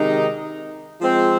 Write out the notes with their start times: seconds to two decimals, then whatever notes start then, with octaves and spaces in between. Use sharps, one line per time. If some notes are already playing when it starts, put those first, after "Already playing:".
Already playing: C3 D#3 G#3 D#4
1.01 F3 G#3 C4